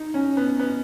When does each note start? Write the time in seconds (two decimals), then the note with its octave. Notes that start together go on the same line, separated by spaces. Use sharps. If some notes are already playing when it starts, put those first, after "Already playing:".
Already playing: D#4
0.14 C#4
0.37 B3
0.59 B3